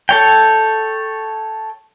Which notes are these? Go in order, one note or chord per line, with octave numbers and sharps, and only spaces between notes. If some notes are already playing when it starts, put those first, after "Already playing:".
A4 C#5 G5